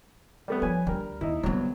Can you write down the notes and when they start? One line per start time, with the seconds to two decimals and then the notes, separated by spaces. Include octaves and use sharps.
0.48 G3 A3 B3
0.62 F3 B4 C#5 G#5
0.87 D2 G3 A#4
1.21 D#2 D#4 E4
1.43 C2 D3 F#3 B3